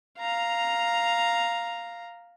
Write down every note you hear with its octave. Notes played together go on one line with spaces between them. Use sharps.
F5 A#5